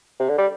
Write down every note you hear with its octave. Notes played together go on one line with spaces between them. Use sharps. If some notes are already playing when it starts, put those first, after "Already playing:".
C3
D3
G3